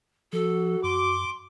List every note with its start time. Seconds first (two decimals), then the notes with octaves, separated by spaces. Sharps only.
0.33 F3 F#4 A4
0.83 F#2 C6 D6